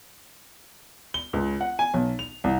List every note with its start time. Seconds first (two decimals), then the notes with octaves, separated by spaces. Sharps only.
1.14 G7
1.33 C#2
1.61 F#5
1.79 G#5
1.94 B1
2.19 F7
2.44 C2